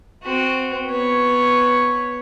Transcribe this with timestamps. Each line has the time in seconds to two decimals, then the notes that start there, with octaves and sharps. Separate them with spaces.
0.23 C4 F#4
0.87 B3 C#5